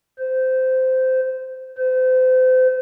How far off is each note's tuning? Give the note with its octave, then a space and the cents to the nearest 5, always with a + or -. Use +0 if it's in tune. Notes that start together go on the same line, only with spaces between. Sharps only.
C5 -15
C5 -35